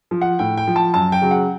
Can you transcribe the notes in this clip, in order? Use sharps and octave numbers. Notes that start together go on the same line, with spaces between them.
F3
F#5
A2 G5
G5
F3
A5
F#2 A5
G5
C#3 F#3
F#5